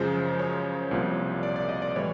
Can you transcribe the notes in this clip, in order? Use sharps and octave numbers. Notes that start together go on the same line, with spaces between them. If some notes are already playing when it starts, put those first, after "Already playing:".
Already playing: F#2 C#3 F3 G#3 C5
C#5
C2 A#2 F3
D5
D5
D#5
D5
A2 E3 G3 C#5